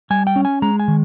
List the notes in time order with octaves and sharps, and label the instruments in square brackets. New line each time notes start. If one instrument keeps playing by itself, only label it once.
[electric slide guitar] G3 G#5
G5
C#4
G#5
G#3 A#5
G#5
D#3